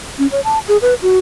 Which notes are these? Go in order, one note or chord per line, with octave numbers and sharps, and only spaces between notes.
C#4
C#5
A5
G#4
B4
F#4